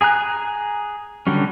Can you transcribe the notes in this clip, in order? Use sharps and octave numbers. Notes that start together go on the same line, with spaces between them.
G#4 G#5 A#5 F#6
D3 F#3 G3 C#4